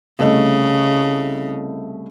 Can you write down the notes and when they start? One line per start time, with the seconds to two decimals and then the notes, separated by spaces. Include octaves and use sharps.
0.19 C2 C#3 A3 D#5